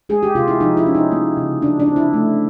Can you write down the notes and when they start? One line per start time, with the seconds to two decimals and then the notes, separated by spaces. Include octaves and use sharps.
0.09 G#3 G#4
0.23 G4
0.35 C3 F4
0.48 E4
0.60 F3 D#4
0.77 E4
0.86 C#4
0.95 D#4
1.12 A#3
1.37 C#3
1.62 F#3 D4
1.80 D4
1.88 C4
1.96 E4
2.13 A3